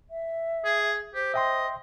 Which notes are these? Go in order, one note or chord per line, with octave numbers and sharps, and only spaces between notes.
E5
G#4
G4 C5
D#5 E5 G5 C6